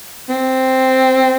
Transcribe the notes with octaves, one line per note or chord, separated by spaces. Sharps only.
C4